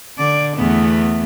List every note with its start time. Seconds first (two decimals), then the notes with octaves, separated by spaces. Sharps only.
0.18 D3 D5
0.56 E2 A3 B3